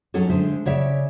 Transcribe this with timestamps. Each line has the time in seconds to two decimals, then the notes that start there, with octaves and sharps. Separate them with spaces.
0.14 F#3 C#4 D#4 F#4 A4 C#5
0.29 D3 G#3 C5 E5
0.66 C#3 C#5 D5 E5